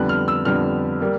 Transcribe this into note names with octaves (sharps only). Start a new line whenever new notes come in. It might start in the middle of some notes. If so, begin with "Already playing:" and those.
Already playing: F2 D3 G3 B3 F#6
F6
E6
F2 D3 G3 B3 F6
G3 A#3